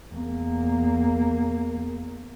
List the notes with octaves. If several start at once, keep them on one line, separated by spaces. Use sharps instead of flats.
E2 A#3